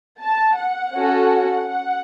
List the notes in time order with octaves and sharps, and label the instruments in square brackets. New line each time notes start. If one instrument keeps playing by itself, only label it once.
[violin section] A5
F#5
C#4 F#4 A4
F#5